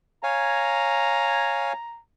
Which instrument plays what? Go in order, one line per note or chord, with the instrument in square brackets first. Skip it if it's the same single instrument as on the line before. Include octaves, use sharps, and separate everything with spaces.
[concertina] C#5 F5 G#5 [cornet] A#5